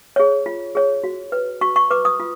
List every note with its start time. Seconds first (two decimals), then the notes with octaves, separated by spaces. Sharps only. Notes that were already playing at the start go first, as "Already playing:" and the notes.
0.16 G#4 C#5
0.46 F4
0.75 G#4 C#5
1.04 F#4
1.32 B4
1.61 F#4 C#6
1.76 C#6
1.90 B4 D6
2.05 D#6
2.20 F4